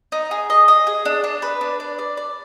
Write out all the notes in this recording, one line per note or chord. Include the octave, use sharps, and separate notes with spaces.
D#4
G#4
D#5
D#5
G#4
D4
D4
B4
D4
D5
D5
D5